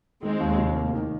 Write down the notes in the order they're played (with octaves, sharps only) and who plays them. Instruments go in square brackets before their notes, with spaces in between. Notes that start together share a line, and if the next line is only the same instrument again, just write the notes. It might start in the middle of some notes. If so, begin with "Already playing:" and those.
[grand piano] D#3 [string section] G#3 C4
[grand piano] D#2
F1
A#3
D#3